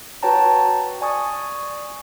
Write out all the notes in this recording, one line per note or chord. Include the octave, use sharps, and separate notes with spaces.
F#4 B4 C#5 G5 A5 A#5
D5 G#5 C#6 D#6